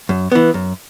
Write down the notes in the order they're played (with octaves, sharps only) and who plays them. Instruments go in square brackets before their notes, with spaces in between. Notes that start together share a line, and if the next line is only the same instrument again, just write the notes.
[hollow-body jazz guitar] F#2
E3 B3
F#2